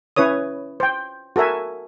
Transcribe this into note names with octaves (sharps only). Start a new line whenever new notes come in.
C#4 E4 B4 C#5 D#6
C5 G5
F#4 A4 A#4 E5 G#5